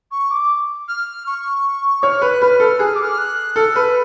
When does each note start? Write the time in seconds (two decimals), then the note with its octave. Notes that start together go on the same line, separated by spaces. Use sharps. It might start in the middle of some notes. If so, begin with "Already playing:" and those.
0.11 C#6
0.30 D6
0.88 F6
1.26 C#6
2.03 C#5 F6
2.22 B4 F#6
2.41 B4 F6
2.60 A4 F6
2.79 G#4 F#6
2.87 F6
2.95 D6
3.03 F6
3.18 F#6
3.56 A4 F6
3.76 B4 F6